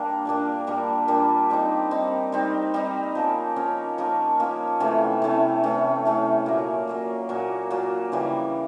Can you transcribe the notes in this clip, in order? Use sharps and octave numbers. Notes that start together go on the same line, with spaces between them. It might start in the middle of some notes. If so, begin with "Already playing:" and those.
Already playing: G3 A#3 D4
A#2 G3 A#3 D4
A#2 G3 A#3 D4
A#2 G3 A#3 D4
G3 C4 D#4
G3 C4 D#4
G3 C4 D#4
G3 C4 D#4
F3 A#3 C#4
F3 A#3 C#4
F3 A#3 C#4
F3 A#3 C#4
C3 E3 A3 C#4
C3 E3 A3 C#4
C3 E3 A3 C#4
C3 E3 A3 C#4
A#2 F#3 A#3
A#2 F#3 A#3
A#2 F#3 A#3
A#2 F#3 A#3
C#3 E3 G3